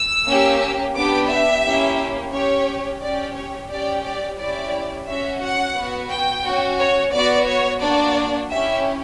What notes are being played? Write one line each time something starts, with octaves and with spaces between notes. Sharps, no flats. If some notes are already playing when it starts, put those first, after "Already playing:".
Already playing: E6
A#3 C#4 G4
B3 D4 G4 D6
E5
A#3 C#4 E4 G4
C#4 G4 C#5
C#4 G4 D5
C#5
C#4 G4 D5
D5
C#4 E4 G4 D5
C#4 F#4 E5
F#5
B3 F#4
G5
C#4 F#4
C#5
B3 F#4 D5
C#5
A#3 D4 F#4 D5
C#4 E4 G4 E5